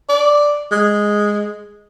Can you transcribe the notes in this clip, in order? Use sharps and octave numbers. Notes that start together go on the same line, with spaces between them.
D5
G#3